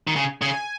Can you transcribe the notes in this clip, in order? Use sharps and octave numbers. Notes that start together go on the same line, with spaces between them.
D#3
C#3 G#5
C#3 G#5